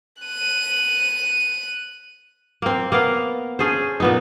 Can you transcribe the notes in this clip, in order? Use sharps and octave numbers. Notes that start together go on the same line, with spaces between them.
F#6 D#7
A#3 C4
A#3 B3 A#4 F5
C#4 G#4 A4 C5
A#2 B3 D#4